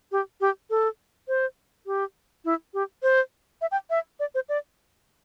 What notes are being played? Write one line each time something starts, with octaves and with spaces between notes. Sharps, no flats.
G4
G4
A4
C5
G4
E4
G4
C5
E5
G5
E5
D5
C5
D5